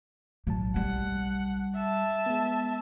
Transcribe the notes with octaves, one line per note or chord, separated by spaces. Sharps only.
B1 A2 F#3 A5
G3 F#5
E5 A5
G#3 B3